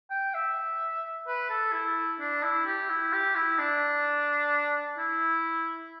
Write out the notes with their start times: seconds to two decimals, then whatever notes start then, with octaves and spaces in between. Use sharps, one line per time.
0.10 G5
0.34 E5
1.27 B4
1.50 A4
1.73 E4
2.20 D4
2.43 E4
2.66 G4
2.89 E4
3.13 G4
3.36 E4
3.59 D4
4.98 E4